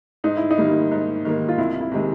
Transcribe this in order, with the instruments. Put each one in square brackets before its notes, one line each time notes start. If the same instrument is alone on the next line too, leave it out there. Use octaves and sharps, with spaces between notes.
[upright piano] G#2 [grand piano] D#4
[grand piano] E4
D#4
[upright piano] D#3 G3 A#3
G#2
D#3 G3 A#3
[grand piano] F4
[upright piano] C2 [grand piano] E4
[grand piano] E4
[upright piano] C3 D#3 G#3